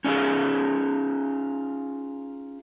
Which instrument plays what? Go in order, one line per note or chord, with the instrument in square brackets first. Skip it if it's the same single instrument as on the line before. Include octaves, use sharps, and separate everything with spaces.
[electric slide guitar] C#4 D#4 F4 G#4 F5